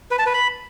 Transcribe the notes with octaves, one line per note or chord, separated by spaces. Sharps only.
B4
A5
B4
B5